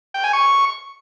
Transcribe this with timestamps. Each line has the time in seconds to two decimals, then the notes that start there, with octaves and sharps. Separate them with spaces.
0.14 G5
0.24 G#5
0.33 C#6